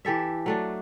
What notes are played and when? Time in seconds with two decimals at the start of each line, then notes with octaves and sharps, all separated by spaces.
0.05 E3 G4 A4 E5
0.46 F#3 A3 D4